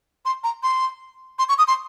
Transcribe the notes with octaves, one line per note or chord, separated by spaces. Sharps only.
C6
A#5
C6
C6
C#6
D#6
C6